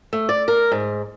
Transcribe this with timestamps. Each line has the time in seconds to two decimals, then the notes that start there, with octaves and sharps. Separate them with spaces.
0.13 A3
0.29 D5
0.48 A#4
0.72 G#2